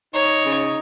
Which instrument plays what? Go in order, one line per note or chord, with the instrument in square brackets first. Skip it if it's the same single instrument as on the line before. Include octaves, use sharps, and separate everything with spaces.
[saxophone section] D#4 [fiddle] C#5
[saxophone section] C#3